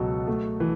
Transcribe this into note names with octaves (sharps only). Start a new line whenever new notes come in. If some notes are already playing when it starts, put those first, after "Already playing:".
Already playing: C#2 B2 F#3 A4
A3
E3